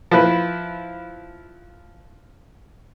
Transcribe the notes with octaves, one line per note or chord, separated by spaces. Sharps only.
F3 E4 B4